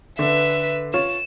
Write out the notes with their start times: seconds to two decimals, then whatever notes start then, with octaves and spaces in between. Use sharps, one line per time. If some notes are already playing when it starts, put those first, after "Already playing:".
0.19 D3 B4 E5
0.94 F4 C#5 E7